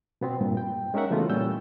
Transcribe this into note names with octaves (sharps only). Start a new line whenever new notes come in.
B2 B3 C4
G2 A#2
G5
G#3 C#4 D#4 A#4 E5 F#5
C#3 E3 A3 B3 F4 F#4
A#2 G3 C#4 E6 G6